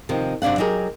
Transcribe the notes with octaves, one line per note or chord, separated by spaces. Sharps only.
C3 D#3 F3
F#2 C3 D4 F5 F#5
F#3 D#4 G4 G#4 A#4